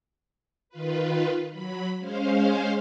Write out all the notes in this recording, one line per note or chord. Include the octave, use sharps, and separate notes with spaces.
D#3 F4 B4
F#3 B5
G#3 C#4 C5 F5